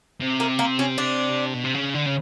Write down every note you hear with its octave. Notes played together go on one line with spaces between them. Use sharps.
C3
A#3
A#3
C#4
D4
B2
C3
C#3
D3
C#3